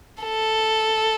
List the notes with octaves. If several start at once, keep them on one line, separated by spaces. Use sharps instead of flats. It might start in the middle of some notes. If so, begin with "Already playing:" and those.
A4